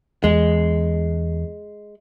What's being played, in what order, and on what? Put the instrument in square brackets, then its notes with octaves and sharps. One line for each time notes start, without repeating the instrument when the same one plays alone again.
[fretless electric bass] E2 [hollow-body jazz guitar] G#3